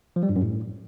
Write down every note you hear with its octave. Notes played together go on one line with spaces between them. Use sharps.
F3
G3
G2
F#2
A2